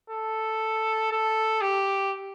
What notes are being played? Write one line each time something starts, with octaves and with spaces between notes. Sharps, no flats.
A4
A4
G4